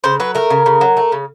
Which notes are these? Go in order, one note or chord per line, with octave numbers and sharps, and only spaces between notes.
C#3 C5
F#3 B4
A3 A#4
C#3
C#3
F#3
A3
C#3